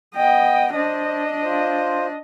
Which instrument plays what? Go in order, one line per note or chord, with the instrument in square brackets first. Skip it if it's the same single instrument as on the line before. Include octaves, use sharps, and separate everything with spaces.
[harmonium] B3 [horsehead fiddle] D#5 G5
[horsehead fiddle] D4 D#5 [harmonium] C5
[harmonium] F4 C5